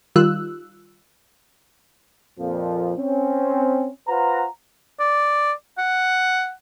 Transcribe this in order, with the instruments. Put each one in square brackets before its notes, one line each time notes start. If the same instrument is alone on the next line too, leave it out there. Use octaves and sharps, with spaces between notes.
[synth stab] D#3 G3 F4 E6 F#6
[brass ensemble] F2 A#2 F3
C4 C#4
F4 B4 C5 F#5 A#5
[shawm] D5
F#5